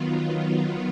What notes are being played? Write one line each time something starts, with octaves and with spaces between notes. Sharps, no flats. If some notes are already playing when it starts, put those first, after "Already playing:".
Already playing: D#3 F#3 B3 F4